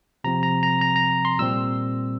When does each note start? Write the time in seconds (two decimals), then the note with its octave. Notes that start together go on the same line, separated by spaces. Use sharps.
0.24 C3 F3 C4 A#5
0.43 A#5
0.63 A#5
0.81 A#5
0.96 A#5
1.25 C6
1.39 A#2 G3 C4 E6